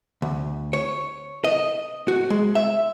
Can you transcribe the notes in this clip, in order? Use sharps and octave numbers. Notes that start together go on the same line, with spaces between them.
D2
C#5
D#5
F#4
G#3
E5